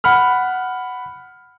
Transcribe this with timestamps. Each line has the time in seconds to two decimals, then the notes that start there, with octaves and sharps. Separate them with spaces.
0.04 F#5 B5 F6